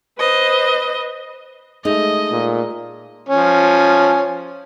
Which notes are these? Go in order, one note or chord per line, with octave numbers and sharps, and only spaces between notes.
B4 C5 D#5
G#3 A3 D#4 D#5
A#2
F3 C#4